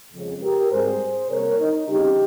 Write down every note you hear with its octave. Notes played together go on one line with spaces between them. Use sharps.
F2 C#3 G#3
G4 A#4
G#2 G3 C4 G#4 C5
C3 G3 A#3 A#4 C#5
D#4
C#3 G3 C4 D#4 G4